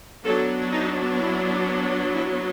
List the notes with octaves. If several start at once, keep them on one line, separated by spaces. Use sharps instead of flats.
F#3 B3 D4 A4
D#4
E4
E4